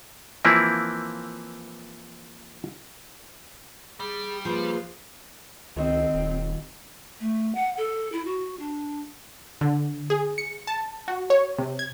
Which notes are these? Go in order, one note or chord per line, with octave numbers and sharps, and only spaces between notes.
E3 F3 A#3 C4 E4
G3 G#4
F3 A#3 G#4 B4
C#2 D#3 C4 D#5 E6
D#1
A3
F#5
A4
E4
F#4
D4
D3
G#4
C#7
A5
F#4
C#5
C3
G#6